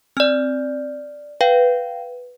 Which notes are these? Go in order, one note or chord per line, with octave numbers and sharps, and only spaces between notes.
C4 D5 F6
B4 F5 G5